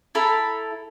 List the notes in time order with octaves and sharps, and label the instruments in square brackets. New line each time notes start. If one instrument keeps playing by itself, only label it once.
[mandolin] E4 A4 A#5 B5